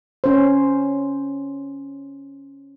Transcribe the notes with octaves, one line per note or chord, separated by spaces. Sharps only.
C#4 C5